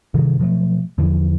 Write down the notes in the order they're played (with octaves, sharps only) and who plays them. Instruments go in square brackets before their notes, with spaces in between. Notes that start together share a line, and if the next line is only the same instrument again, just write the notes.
[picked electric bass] G2 C3 D#3 E3
B2 F3 F#3 A3
E2 D3 E3 F3